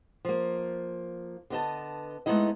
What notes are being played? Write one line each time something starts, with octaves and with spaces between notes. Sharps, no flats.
F3 A#3
D3 B3 D#5 A5
G#3 A3 B3 D#4 E4 D#5